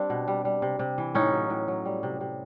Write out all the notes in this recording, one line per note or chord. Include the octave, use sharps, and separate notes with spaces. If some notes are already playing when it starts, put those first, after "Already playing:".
Already playing: G3 C4 D4
B2
G3
G3
C3
C3
E3
A2 C#4 D#4
F#3
A2
F#3
G3
C3
C3